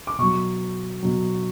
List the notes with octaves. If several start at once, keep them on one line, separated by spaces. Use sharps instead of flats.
D6
B2 F#3 C#6
B2 F#3